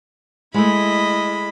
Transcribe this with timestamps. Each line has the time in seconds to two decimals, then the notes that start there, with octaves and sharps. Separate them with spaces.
0.54 G#3 A3 E4 D#5 B5